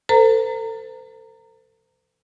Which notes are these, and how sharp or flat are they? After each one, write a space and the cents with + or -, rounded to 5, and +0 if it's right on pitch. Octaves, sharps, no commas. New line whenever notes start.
A4 +30 C5 -40 A#5 -20